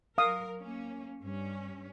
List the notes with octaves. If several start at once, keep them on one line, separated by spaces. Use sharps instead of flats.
F#3 A#4 F5 D#6
A#3 C#4
G2 C#4